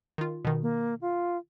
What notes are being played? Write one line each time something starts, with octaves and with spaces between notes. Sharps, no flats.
D#3 F4
B2 D#3
A#3
F4